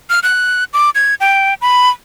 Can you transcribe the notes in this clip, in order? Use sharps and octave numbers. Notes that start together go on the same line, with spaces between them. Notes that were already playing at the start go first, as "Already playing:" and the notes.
F6
F#6
D6
G#6
G5
B5